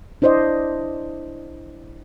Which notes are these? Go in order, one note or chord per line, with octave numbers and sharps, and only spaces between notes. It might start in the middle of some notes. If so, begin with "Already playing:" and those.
D4 E4 C5 D5 D#5